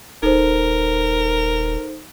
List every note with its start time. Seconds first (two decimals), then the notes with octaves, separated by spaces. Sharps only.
0.23 D#1 D#4 A4 A#4 C5